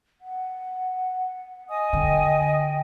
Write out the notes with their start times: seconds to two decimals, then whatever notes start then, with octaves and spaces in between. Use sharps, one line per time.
0.21 F#5
1.69 D#5 G#5 D#6
1.93 D3 G5